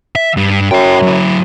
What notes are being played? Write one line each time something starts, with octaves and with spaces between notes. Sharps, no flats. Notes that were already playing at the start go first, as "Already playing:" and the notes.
E5
G2
F#2 C#5 G5
F#3 E4